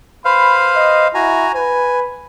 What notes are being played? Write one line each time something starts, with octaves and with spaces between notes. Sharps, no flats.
B4 C5 F5 B5
D#5
E4 F#4 G#5 A#5
B4 G#5